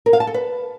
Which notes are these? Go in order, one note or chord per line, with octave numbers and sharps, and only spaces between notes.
A#4
F5
A5
A4
B4